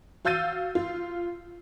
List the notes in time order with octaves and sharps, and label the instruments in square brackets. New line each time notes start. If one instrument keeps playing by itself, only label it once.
[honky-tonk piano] F#4 F5 E6 G6 A6 D#7
F4